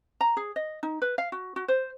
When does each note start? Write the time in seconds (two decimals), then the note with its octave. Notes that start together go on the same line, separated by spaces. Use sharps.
0.21 A#5
0.37 G#4
0.56 D#5
0.83 D#4
1.02 B4
1.18 F5
1.32 F#4
1.56 F#4
1.68 C5